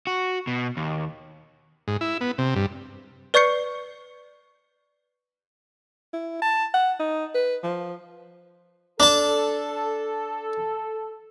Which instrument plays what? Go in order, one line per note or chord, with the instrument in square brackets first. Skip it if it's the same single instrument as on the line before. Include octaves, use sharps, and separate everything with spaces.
[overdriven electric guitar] F#4
B2
D#2
[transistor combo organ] G#2
E4
B3
C3
G2
[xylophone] B4 D5 C#6 G6 C7 C#7
[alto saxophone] E4
A5
F#5
D#4
B4
F3
[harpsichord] D4 A5 [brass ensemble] A4